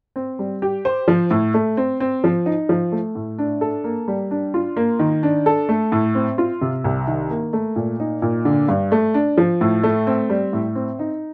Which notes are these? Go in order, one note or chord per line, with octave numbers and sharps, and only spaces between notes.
C4
G3
G4
C5
F3
A2
A3
C4
C4
F3
D#4
F3
A3
A2
D4
A4
A#3
G3
D4
F4
A#3
D#3
D4
A4
A3
A2
C4
F4
C3
C2
D#3
A#3
A3
A#2
D#4
A#2
D3
G2
A3
D4
F3
A2
A3
C4
G3
A2
C4
D#4